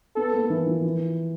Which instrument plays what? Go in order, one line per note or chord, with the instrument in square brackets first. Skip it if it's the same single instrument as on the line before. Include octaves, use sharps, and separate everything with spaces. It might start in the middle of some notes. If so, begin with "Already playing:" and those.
[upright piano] B3 [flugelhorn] A4
[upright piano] A#3
E3
F3
E3